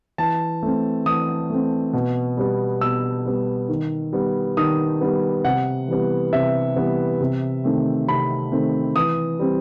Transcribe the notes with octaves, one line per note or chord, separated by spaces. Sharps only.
E3 A5
A3 C4
E3 D#6
A3 C4
B2
G3 B3
B2 E6
G3 B3
D#3
G3 B3
D#3 D#6
G3 B3
C3 F#5
E3 G3 B3
C3 E5
E3 G3 B3
C3
D#3 A3 C4
C3 B5
D#3 A3 C4
E3 D#6
G3 C4